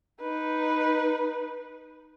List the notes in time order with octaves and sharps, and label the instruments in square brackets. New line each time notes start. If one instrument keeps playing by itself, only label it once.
[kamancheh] D#4 B4